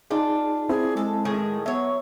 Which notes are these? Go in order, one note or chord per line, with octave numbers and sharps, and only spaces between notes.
D4 D#4 F4 G#4
C4 E4 G#4
G#3 A4
A2 D#3 G#4
F#3 B3 C#5 E5